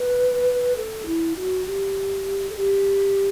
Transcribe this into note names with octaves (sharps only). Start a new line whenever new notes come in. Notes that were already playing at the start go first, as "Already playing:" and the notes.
Already playing: B4
A4
E4
F#4
G4
A4
G4